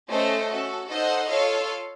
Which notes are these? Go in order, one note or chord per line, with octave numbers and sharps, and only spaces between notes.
A3 C#4 A4 C5 D#5
C#4 F#4 A4
D#4 A4 C5 D#5 F#5
F4 A4 C#5 F5